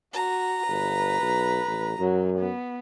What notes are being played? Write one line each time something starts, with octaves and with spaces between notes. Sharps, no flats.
F#4 A#5
G1 B4
B1
A1
F#2 F#3
B3